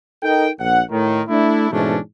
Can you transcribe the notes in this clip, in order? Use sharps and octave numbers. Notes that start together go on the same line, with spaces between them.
D#4 A4 A#4 G5
A#1 F#5
A2 D#3
A3 D4 E4
G#2 B2 E3 A3 C#4 D4